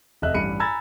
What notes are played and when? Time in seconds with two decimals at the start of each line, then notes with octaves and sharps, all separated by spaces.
0.22 F1 D#5 E5 F#6
0.34 A1 G2 B5 C#7 D#7
0.59 G#5 A#5 B5 E6 G#6 A6